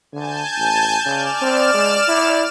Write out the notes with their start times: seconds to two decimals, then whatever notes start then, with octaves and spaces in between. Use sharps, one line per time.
0.13 D3 G#5 A5 G6
0.57 A1
1.06 C#3 D5 F6 E7
1.42 C4
1.74 G#3
2.08 E4